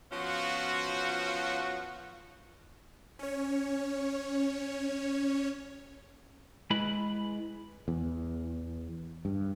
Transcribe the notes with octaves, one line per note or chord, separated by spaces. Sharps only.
F3 B3 C#4 F4 F#4
C#4 C#5
G#3 E4 B4 B5
E2
G2